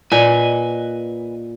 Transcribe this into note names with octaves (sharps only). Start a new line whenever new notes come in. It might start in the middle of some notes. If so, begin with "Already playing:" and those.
A#2 B4 D#5 G#5